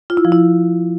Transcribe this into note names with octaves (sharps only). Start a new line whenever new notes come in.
F4
E4
F3
E4